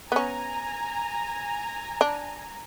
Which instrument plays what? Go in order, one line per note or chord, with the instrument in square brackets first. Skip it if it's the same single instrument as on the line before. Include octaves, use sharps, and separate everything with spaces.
[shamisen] B3 C#4 [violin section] G#5 A#5
[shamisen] D4